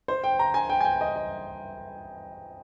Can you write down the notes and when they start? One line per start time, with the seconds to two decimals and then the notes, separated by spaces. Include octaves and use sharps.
0.08 C5
0.24 G5
0.39 A#5
0.54 G#5
0.69 G5
0.81 G#5
0.85 G5
1.01 D#5
1.16 D#5